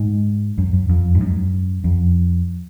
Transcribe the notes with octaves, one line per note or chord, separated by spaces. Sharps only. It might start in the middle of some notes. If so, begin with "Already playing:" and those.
Already playing: G#2
F#2
F#2
F2
G#2
F#2
F2